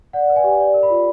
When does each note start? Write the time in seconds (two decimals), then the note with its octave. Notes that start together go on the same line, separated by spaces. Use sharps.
0.13 D5 F#5
0.30 B4
0.36 G#5
0.44 G4
0.60 D5
0.74 A#4
0.83 B5
0.90 F4